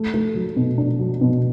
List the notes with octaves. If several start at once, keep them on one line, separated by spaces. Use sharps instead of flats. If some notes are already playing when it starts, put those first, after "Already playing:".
Already playing: A3
A3
F#3
B2
D4
F#3
B2